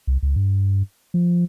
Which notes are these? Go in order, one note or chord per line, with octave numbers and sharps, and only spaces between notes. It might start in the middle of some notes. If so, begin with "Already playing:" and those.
C2
C#2
G2
F3